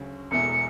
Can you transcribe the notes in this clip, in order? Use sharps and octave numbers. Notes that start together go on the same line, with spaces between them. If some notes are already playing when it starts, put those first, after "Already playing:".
Already playing: D2 C#3 F#3
E1 E2 B2 A3 E4 C#7